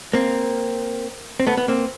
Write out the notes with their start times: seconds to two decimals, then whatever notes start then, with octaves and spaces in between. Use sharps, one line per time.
0.14 A#3 C4
1.40 C4
1.47 A3 B3
1.57 B3
1.68 A#3 C4